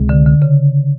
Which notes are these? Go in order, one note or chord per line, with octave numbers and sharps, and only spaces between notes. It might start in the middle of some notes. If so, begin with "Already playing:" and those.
Already playing: C#2 C3 G#3
D3
D3
C#3